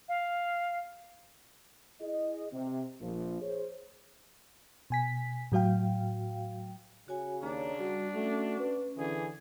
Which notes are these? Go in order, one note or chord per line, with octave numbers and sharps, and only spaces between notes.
F5
E4 G#4 D#5
C3
A#1 F3
G#4 C5 C#5
B2 G#5 B6
A2 F#3 F#4 F5 G5
C#3 F#4 C#5 G#5
D#2 D4 C#5 A#5
G3 F#4
A3 C#4 F#4
B4
D3 E3 G#4